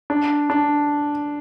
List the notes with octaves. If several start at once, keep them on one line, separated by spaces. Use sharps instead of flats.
D4
D4